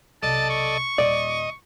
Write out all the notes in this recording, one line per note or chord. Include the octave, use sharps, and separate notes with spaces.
B1 C3 A4 D5 D#5 A5
C#6
D#1 A#2 D5 D#5